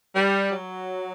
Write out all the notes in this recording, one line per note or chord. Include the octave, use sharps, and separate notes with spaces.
G3
F#3